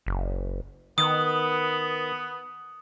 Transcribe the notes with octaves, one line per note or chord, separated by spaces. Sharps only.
F#1
D#3 B3 D#6